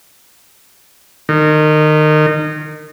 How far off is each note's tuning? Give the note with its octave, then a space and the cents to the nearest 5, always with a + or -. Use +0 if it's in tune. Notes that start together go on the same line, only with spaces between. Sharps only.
D#3 -25